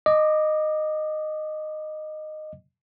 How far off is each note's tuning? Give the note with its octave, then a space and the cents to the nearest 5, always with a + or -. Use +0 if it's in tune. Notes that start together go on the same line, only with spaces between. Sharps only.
D#5 -10 D6 +10